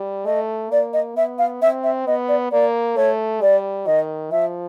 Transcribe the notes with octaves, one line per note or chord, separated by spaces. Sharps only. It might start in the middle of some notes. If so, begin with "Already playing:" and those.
Already playing: G3
A3 D#5
A#3 D5
D#5
B3 E5
F5
C4 E5
E5
B3 D#5
D5
A#3 D5
A3 C#5
G3 D5
D#3 D#5
F3 E5